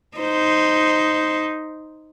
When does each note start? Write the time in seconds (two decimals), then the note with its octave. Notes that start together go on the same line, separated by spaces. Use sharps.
0.17 D#4 C5